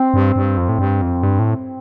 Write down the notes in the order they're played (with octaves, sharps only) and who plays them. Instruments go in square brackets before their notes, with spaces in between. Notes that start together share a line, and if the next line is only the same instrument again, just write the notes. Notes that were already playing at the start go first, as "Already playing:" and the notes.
Already playing: [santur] C4
[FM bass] G2
G2
F2
A2
G2
F2
G2
A2